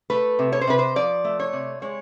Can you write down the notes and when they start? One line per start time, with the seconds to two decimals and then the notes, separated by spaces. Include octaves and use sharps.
0.10 A3 B4
0.39 C3
0.52 C#5
0.61 C5
0.67 C3 B4
0.79 C5
0.96 F3 D5
1.24 A3
1.39 C#5
1.53 C3
1.82 G#3 C#5